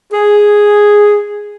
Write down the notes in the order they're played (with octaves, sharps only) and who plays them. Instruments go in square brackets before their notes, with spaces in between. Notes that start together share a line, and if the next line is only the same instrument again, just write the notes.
[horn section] G#4